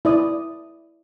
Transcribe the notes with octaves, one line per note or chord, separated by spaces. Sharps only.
E4 D5 D#6